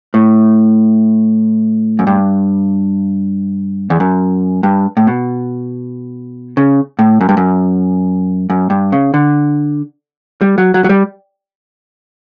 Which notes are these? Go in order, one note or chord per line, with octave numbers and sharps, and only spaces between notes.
A2
F#2
G2
E2
F#2
G2
A2
B2
C#3
A2
F#2
G2
F#2
F#2
G2
C#3
D3
G3
F#3
F#3
F#3
G3